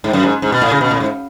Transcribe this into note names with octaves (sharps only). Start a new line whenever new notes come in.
G#2
F#2
G#2
G#2
B2
A2
C#3
B2
A2
G#2